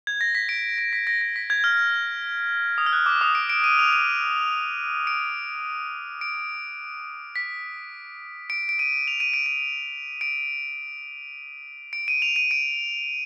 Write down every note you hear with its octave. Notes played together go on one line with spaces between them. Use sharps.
G#6
A#6
B6
D7
D7
B6
A#6
A#6
B6
G#6
F6
D#6
F6
F#6
D6
D#6
D7
D7
D#7
F7
D#7
D7
D7
B6
D7
D7
D#7
F7
D#7
D7
D#7
D7
D7
D#7
F7
D#7
D7